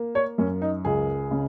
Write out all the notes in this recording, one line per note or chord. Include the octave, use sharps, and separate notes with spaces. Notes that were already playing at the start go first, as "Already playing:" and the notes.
Already playing: A#3
C#5
F#2 C#4
D#4
C#2 G#4
C#3